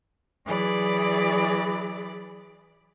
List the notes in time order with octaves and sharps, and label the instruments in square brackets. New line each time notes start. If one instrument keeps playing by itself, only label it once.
[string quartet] E3 F#3 G#4 D5 B5